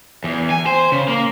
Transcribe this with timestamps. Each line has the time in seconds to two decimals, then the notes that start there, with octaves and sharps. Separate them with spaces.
0.24 E2
0.50 G#5
0.66 C5
0.92 C#3
1.08 A#3